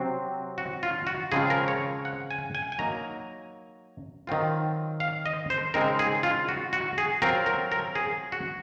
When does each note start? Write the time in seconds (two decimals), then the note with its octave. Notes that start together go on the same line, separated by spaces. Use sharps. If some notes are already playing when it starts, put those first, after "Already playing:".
Already playing: C3 F#3 C4
0.58 F#4
0.83 F4
1.07 F#4
1.32 C#3 F3 G#3 C4 F4 G#4
1.50 A#4
1.68 C#5
2.05 F#5
2.31 G#5
2.55 G#5
2.72 G#5
2.79 F#3 A#3 D#4 A#5
4.27 D#3 F#3 C4 F4
5.00 F5
5.26 D#5
5.50 C5
5.74 C#3 G#3 C4 D#4 A#4
5.99 G#4
6.23 F4
6.49 F#4
6.73 F#4
6.98 G#4
7.22 F#3 C4 F4 A#4
7.46 A#4
7.72 A#4
7.95 G#4
8.32 F#4